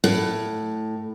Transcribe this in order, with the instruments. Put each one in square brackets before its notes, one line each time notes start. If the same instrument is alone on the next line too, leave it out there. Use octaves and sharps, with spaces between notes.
[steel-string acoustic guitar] A2